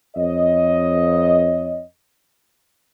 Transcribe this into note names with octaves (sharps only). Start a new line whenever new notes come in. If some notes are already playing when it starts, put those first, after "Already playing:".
F2 C#5 D#5